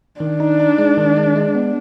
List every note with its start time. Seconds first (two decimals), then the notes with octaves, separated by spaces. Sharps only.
0.20 D#3 D4
0.40 D#4
0.59 D#4
0.78 G#3
0.97 D#3
1.16 G#3
1.36 G#3
1.55 B3